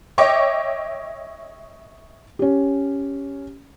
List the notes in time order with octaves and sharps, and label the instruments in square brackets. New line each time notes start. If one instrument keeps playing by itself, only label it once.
[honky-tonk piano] C#5 D#5 E5 G5 C#6 D6
[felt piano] C#4 G4